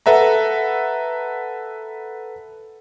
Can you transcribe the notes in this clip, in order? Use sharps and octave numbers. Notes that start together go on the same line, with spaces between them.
A4 B4 E5 F#5 A#5